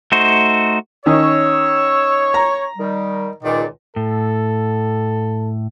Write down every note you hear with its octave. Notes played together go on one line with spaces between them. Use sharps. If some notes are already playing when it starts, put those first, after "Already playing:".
A3 D#4 F#4 C5
D#3 C#4 D#4 C#5 E6
A#5
D#3 G3
C#2 A#2 D#3 D5
A2 A4